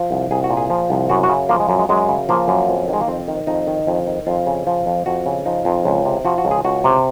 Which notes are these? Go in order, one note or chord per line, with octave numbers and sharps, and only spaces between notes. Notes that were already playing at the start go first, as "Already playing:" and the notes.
Already playing: F3
C2
C2 G#4
F#4
A#2
G#4
F3
C2
F#2 F#4
F#4
C#3
F3 A#3
G#3
F#2
G#3
F#2 G#3
C#3
F3 A#3
F#2
F2
D#3
G#3
A#3
F2 C4
D#3
F2 D#4
D#3
F2
D#3
F2 F4
C#3
F3
F2
F2 F#4
C#3
F3 D#4
F2
C#2
C3
F3 F#4
F#4
C#2
G#4
C#2 F#4
C3